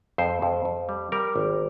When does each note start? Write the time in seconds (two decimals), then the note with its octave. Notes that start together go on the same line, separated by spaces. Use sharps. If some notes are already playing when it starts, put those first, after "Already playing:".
0.18 F2 C5
0.42 F2
0.65 F2
0.89 G3
1.12 G3 A#4
1.36 G#1